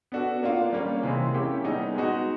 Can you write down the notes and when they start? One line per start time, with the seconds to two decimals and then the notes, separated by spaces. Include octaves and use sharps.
0.12 B3 D4 F#4 A4
0.43 A#3 D4 F4
0.72 G3 A#3 C#4
1.03 C3 E3 G#3 C4
1.34 A#3 C#4 E4 G4
1.64 G3 B3 D#4 G#4
1.95 G#3 B3 D#4 F#4